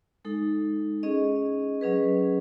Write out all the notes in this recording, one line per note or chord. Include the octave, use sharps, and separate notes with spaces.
G#3 D#4 A4
C#4 G#4 D#5
F#3 C#4 G#4 B4